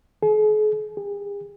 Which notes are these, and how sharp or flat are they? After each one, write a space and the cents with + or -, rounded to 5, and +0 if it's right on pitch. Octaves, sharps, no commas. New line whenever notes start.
G#4 +45
G#4 -45